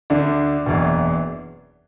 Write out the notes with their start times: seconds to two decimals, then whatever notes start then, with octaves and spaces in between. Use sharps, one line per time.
0.10 D2 D3 D4
0.66 F#1 E2 B2